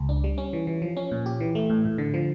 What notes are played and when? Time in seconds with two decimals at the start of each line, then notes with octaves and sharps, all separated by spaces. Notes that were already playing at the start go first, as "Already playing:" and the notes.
Already playing: C#2
0.09 D4
0.24 G3
0.38 C#4
0.53 E3
0.67 E3
0.82 F3
0.97 C#4
1.11 A#2
1.26 G4
1.40 E3
1.55 A3
1.70 A2
1.85 A2
1.98 D3
2.14 F3